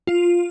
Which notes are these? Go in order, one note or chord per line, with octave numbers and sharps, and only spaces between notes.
F4